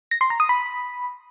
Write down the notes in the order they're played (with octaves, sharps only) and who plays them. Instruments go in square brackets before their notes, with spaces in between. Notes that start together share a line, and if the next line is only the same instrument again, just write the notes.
[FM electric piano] A#6
C6
A#5
D#6
B5